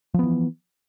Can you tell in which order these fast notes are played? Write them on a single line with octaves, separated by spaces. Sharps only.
F3 B3 E3